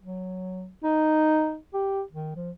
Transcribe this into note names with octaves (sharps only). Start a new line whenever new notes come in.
F#3
D#4
G4
D#3
F3